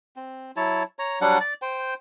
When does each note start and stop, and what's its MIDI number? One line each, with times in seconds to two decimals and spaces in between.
0.16 0.51 60
0.56 0.83 54
0.56 0.83 64
0.56 0.83 73
0.56 0.83 81
0.99 1.19 73
0.99 1.19 82
1.21 1.38 54
1.21 1.38 55
1.21 1.38 62
1.21 1.38 78
1.40 1.54 74
1.62 1.94 72
1.62 1.94 79